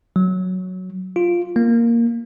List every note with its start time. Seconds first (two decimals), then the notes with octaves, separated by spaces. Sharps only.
0.16 F#3
1.16 F4
1.56 A#3